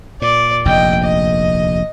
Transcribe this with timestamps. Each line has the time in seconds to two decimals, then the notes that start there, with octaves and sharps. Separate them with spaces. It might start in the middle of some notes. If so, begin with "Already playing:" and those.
0.22 A#2 D5
0.65 F1 A#1 D#2 D#5 G5
1.03 D#5